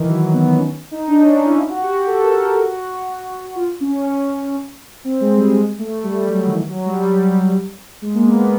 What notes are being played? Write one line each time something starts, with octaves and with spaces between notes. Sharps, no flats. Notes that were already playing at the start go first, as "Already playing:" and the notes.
Already playing: D#3 E3
F#3
B3
C#4
D#4
D4
C#4
C#4
E4
F4
F#4
G4
A4
A#4
A#4
F#4
F4
C#4
C#4
C4
G#3
G3
G#3
A3
G3
F#3
D#3
E3
F#3
G3
G3
G#3
A#3
B3